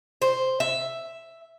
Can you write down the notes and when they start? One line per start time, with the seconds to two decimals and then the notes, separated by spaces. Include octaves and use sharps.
0.22 C5
0.60 E5